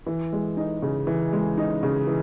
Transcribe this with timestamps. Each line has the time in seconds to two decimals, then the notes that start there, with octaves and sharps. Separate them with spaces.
0.06 E3
0.33 G#3
0.57 D#4
0.82 C#3
1.07 E3
1.33 G#3
1.58 D#4
1.83 C#3
2.07 E3